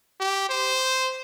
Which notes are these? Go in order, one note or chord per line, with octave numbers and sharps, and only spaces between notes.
G4
C5